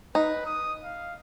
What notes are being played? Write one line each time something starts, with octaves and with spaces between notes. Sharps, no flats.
D#4 B4
D#6
F5